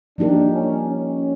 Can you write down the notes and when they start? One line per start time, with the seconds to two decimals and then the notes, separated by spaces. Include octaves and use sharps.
0.18 F3 A#3 D4 D#4 G4 A#4
0.53 C#4
0.88 C#4